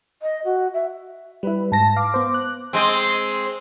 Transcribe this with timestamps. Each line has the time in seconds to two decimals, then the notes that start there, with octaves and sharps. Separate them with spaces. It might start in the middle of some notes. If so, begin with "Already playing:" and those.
0.22 D#5
0.45 F#4
0.74 E5
1.43 G3 E4 B4
1.72 G#2 A5 A#6
1.96 F5 D6
2.14 B3 C5
2.34 F#6
2.73 G#3 C4